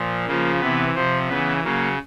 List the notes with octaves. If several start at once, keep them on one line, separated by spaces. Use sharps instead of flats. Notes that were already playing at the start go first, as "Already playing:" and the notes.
Already playing: A#2 F3
C#3 F3 A#3
C3 E3 B3
C3 F3 C4
C#3 E3 B3
C#3 F#3 A#3